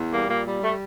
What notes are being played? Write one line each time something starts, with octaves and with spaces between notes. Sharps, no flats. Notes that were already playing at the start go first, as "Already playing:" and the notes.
Already playing: E2
G3 A#3
A#2 A#3
G3
G3 A3